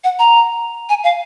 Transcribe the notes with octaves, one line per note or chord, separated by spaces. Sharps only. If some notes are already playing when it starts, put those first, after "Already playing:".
F#5
A#5
G#5
F5